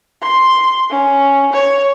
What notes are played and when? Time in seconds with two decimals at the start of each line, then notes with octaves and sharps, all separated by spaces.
0.22 C6
0.90 C#4
1.52 C#5